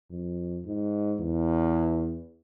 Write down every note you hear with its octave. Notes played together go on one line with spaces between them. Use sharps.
F2
G#2
E2